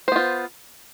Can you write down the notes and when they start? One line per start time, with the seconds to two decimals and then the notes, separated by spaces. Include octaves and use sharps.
0.08 C5
0.12 B3
0.16 F4